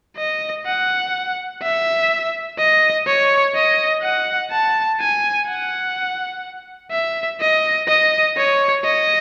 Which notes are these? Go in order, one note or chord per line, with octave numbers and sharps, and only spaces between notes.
D#5
F#5
E5
D#5
C#5
D#5
F#5
A5
G#5
F#5
E5
D#5
D#5
C#5
D#5